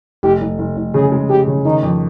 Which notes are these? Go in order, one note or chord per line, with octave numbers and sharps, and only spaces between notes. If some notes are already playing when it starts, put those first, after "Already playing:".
F1 G4
F1
F1
F1
C#3 G#4
G#3
G#3 G4
C#3
D#3 D#4
F2